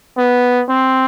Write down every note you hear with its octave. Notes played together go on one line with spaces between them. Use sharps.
B3
C4